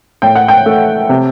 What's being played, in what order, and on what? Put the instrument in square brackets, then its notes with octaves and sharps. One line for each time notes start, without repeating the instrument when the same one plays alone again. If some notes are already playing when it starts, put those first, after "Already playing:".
[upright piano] A2 G5
F#5
G5
A3
C3